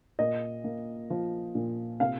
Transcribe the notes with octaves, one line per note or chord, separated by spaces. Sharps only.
A#2 D#5
A#3
F3
A#2
C3 F5